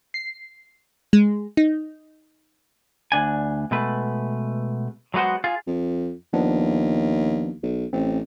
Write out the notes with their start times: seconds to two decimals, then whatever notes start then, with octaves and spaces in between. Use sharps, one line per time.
0.14 C7
1.13 G#3
1.57 D#4
3.12 D2 D4 G#5
3.71 B2 G#3 A3 B4
5.14 F#3 G#3 B3 F#4 C5
5.44 F4 G#4
5.67 F2
6.33 D#2 F3 B3 D4
7.63 B1
7.93 A1 C4